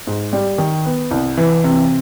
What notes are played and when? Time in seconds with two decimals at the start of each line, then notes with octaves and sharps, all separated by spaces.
0.07 G#2
0.33 G3
0.58 D#3
0.86 B3
1.11 C2
1.37 E3
1.64 C3